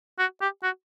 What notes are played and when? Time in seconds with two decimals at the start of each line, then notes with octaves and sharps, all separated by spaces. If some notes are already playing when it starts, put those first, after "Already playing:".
0.19 F#4
0.41 G4
0.63 F#4